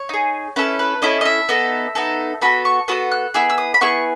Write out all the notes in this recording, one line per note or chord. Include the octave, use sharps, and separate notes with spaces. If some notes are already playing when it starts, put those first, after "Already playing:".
Already playing: C#5
D#4 G#4
C#4 E4 A4 B4
B4
C#4 E4 A4 D#5
D#5
E5
B3 D#4 A4
B3 D#4 A4
B3 F#4 A4 B5
C#6
B3 F#4 A4 D#6
F#6
B3 E4 G#4 E6
E6
D#6
B5
B3 E4 G#4 C#6